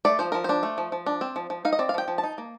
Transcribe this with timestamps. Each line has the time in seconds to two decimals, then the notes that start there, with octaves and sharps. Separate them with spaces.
0.05 A3 D5
0.19 F3 C5
0.32 F3 A#4
0.44 D4 C5
0.63 A3
0.78 F3
0.92 F3
1.06 D4
1.21 C4
1.36 F3
1.50 F3
1.65 D#4 F5
1.73 D#5
1.79 C4 D5
1.89 F5
1.94 F3 G5
2.08 F3
2.18 A5
2.23 D#4
2.38 A#3